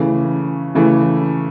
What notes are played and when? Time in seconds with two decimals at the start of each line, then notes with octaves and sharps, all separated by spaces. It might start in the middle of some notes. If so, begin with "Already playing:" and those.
Already playing: C#3 E3 A3
0.75 C#3 E3 A3